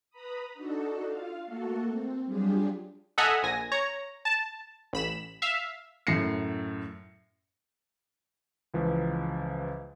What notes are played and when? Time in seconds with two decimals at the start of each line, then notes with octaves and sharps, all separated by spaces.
0.10 B4 A#5 B5 D#6
0.54 D4 D#4 F#4 A4
1.07 F4 F5
1.45 A3 A#3 F#4 A4
1.87 C4
2.26 F#3 G3 D4 F4 G4 G#4
3.18 A4 D#5 E5 F#5 G#5 A#5
3.43 A#1 G#5 A#6
3.72 C#5 A#5
4.25 A5
4.93 A1 B5 E7
5.42 E5 F5
6.07 F#2 A2 A#6 C7 C#7
8.74 C#2 E3 F3 B4